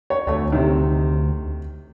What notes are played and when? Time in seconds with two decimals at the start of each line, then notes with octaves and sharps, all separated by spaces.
0.10 C#5
0.27 D2 A3 C#5
0.52 C3 D#3